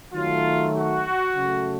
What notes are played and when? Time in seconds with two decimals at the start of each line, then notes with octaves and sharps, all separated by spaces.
0.14 D#3 F#3 A3 F4
0.74 F#4
1.35 C#3 F#3 A3